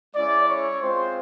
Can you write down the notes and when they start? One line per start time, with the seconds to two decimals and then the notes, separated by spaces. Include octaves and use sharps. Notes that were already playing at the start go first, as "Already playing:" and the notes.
0.15 G#3 C#4 E4 D5
0.48 C#5
0.81 G#3 C4 F4 C5